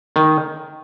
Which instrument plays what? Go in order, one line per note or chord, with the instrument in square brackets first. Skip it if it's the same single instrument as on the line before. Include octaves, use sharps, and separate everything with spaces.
[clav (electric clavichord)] D#3